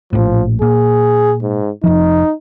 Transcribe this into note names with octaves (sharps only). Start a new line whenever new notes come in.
A#1 A2 F3
A#2 G#4
G#2
F1 F3 D#4